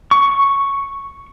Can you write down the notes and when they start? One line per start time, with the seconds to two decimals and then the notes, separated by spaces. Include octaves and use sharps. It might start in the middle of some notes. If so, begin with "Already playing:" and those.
0.11 C#6